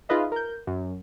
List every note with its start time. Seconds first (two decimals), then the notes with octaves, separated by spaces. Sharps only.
0.09 D#4 F4 G#4 B4 D#5 E5
0.32 A#4 G6
0.67 F#2